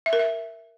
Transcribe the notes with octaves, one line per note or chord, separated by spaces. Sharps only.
E5
A#4
E5